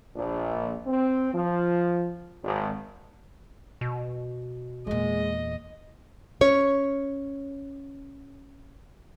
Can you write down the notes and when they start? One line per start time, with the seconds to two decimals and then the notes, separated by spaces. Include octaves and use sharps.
0.15 A#1
0.86 C4
1.33 F3
2.42 G#1
3.81 B2
4.87 E2 A#2 G#3 D#5
6.41 C#4 C#5